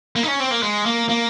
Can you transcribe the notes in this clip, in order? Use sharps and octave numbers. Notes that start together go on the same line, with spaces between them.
A#3
D#4
C#4
C4
A#3
G#3
A#3
A#3